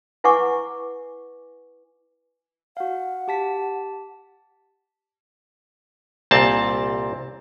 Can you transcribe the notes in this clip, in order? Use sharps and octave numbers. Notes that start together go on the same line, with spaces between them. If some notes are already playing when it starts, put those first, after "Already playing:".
E4 B4 F#5 G#5 C#6 D6
F#4 F5 F#5
G4 A5 B6
C2 A#2 C4 A5